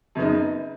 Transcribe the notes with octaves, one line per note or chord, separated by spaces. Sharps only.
F#2 C#3 B3 D#4